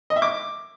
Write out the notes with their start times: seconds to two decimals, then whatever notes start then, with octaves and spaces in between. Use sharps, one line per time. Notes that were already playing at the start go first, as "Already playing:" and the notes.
0.10 D#5
0.16 E5
0.22 D6